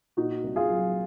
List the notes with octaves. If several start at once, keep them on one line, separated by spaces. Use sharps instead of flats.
A#2 D#4 F#4
C2
F4 G#4
F#3